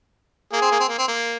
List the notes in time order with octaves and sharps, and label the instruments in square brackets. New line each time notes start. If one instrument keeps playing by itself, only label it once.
[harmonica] A#3 [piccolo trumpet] G#4
[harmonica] C4
A#3
C4
A#3
C4
A#3